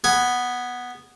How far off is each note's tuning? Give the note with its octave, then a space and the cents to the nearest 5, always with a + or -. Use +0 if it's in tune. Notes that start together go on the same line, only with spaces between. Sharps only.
B3 +0 G#5 +5